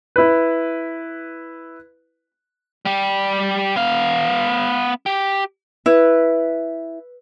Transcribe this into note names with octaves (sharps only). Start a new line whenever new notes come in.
E4 B4
G3 G4
B3 F5
G4
E4 B4